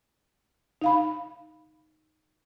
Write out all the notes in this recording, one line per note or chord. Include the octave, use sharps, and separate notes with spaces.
D#4 F5 B5